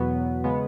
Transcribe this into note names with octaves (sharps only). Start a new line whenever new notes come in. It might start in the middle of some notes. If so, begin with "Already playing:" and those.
Already playing: E2 B2 F#3 B3
C#3 G#3 B3